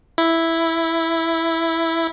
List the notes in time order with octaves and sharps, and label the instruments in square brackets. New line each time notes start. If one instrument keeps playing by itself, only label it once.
[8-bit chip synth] E4